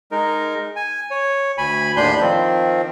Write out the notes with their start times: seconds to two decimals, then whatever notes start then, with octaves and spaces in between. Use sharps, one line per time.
0.12 G#3 D#4 A#4
0.76 G#5
1.11 C#5
1.58 D2 G#5 B5
1.97 D#2 A2 D4 B5 C6 G6
2.20 D#3 F3 C4